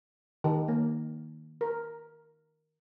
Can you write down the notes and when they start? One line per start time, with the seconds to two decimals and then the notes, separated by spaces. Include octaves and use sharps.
0.44 D#3
0.68 A#3
1.61 A#4